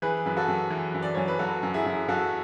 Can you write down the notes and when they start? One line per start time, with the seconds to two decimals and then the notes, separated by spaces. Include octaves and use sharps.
0.02 E3 G#4 B4
0.26 F#2 B4
0.36 F#4 A4
0.48 F#2
0.70 E3
0.94 F#2
1.02 D5
1.14 F#2 C#5
1.28 B4
1.39 F#3 F#4 A4
1.63 F#2
1.74 E4 G#4
1.86 F#2
2.08 F#2 F#4 A4